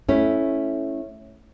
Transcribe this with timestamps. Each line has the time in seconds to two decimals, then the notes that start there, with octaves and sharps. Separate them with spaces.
0.09 A3 C#4 E4